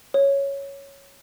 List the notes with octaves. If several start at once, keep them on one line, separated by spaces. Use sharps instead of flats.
C#5